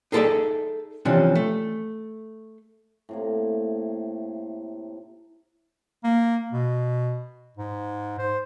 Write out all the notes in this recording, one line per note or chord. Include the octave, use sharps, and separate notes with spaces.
D#4 G#4 A4 B4 D5 E5
C3 E3 F3 C#4 D4
A3
A2 C3 A#3
A#3
B2
G#2
C5